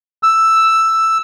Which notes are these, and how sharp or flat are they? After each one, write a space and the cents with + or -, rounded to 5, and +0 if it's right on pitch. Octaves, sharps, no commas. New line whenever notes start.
E6 +5